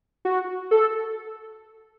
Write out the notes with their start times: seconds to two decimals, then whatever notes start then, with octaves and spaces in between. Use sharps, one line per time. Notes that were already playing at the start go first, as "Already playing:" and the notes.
0.25 F#4
0.71 A4